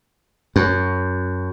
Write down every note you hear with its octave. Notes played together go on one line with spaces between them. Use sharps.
F#2